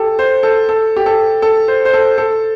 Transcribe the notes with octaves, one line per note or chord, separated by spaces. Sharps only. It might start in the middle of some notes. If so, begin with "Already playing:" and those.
Already playing: G4 A4
C5
A4
A4
G4
A4
A4
C5
C5
A4
A4